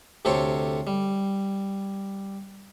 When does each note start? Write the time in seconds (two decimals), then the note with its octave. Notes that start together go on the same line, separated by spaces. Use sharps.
0.25 D2 C3 G4 A4 C5 C#5
0.87 G3